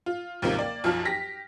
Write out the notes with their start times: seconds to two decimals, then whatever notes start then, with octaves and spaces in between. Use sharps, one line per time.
0.06 F4
0.42 D#2 G#2 C3 F3 A#3
0.59 A#3 D5
0.84 B1 F#2 F3 F4 A5 F6
1.05 G4 A#6 B6